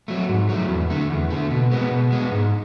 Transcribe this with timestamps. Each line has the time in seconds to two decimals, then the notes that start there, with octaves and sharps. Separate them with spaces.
0.08 F#3 A3
0.29 G#2
0.49 F#3 A3
0.69 E2
0.90 D3 A3
1.10 E2
1.30 D3 A3
1.51 B2
1.72 G#3 B3
1.91 B2
2.12 G#3 B3
2.31 G#2